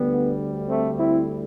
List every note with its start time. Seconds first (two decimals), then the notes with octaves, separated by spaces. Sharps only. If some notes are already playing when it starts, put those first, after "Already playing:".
Already playing: D2 D3 G3 B3
0.68 A3 C4
0.98 C4 E4